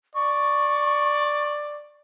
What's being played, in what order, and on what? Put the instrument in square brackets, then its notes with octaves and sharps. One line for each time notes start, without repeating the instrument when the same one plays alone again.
[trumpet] D5 [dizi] C#6